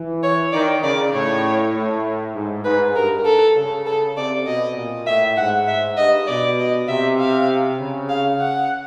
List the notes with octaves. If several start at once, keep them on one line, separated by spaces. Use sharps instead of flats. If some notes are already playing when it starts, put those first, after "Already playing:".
Already playing: E3
C#5
D#3 D5
C#3 D5
A2 C#5
A2
G#2
G#2 B4
G2 A#4
A4
C#3
A4
C3 D5
B2 D#5
A#2
A2 E5
G#2 F#5
E5
G2 D#5
B2 D5
D#5
C3 E5
F5
C#3
F5
F#5